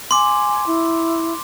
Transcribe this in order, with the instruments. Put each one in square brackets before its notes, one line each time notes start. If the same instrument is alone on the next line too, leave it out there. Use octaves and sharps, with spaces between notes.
[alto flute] G#5 [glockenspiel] C6 D6
[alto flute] E4